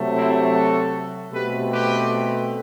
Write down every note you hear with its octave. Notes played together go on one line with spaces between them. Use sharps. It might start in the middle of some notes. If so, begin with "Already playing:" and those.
Already playing: C3 F#3 A3
C4 E4
F#4 A4
B2 A3 C4 G4 B4
G4 B4